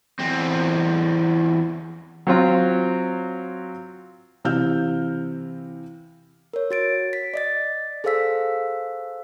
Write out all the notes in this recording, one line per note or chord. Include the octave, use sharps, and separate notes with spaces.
E2 C4
F#3 C4 F4
C3 E3 F5 E6 F6 G6
A#4 C#5
F#4 A6 D7
B6
D5 D#5 A6
G#4 A4 C5 F5 E6 B6